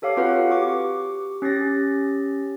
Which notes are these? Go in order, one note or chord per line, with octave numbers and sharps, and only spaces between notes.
G4 A4 C#5 F5 D6
C4 F4 F#4 B4 F5 F#5
G4 C#6 D6
C#4 G4 A6 A#6